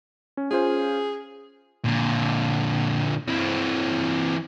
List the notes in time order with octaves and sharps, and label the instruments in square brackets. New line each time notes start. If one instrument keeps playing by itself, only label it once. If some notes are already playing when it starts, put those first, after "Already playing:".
[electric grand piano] C#4
[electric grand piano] C#4 F4 C5 [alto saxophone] G#4
[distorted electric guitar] A#2 D3
E3 C4